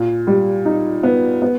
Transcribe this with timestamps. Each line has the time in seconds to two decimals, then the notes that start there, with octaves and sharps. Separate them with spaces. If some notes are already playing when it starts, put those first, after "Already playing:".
Already playing: A#2
0.27 G3
0.65 D#4
1.03 B3
1.42 B3